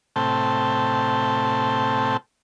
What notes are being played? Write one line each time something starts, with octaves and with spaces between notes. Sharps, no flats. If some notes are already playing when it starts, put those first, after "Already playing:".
A2 C3 A3 C4 G5 A5